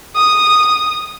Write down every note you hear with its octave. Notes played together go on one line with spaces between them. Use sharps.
D#6